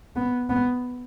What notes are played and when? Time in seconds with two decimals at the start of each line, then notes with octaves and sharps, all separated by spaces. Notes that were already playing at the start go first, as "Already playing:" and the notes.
0.16 B3
0.50 B3